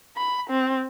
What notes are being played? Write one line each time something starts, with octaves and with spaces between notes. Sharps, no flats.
B5
C4